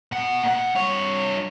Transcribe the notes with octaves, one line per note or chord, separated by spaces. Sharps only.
B2 F#5
A#2 F#5
G2 C#5